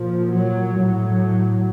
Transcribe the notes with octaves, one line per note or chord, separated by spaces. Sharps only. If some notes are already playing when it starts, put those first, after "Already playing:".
Already playing: A#2 F3
F#3
A2 F#3